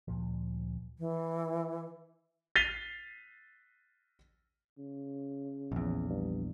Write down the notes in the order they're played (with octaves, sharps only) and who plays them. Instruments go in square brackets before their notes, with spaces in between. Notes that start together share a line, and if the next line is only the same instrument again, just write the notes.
[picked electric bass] D2 A#2 F3
[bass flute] E3
[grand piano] A6 B6 C7 D#7 F7 G7
[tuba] C#3
[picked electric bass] A#1 E2
[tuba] G2